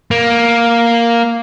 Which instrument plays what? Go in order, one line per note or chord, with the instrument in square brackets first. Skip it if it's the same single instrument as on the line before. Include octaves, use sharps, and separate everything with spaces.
[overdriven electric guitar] A#3